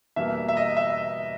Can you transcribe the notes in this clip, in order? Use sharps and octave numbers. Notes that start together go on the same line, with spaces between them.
E2 B2 G3 A#3 E5
E5
D#5
E5
D#5